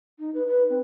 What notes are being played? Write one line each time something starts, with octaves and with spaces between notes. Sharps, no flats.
D#4
B4
B4
C4